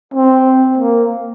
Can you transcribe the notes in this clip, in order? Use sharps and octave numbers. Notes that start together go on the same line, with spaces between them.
C4
A#3